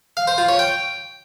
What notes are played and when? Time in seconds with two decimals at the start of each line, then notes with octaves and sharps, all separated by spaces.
0.17 F5
0.27 C5
0.38 F4
0.49 C#5
0.59 G5